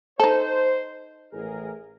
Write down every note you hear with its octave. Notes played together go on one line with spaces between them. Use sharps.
D#4 A4 C5
A1 G#4 A#4